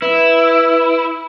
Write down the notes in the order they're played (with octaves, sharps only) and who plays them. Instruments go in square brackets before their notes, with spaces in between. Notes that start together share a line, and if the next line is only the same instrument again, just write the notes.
[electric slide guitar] E4 [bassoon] B4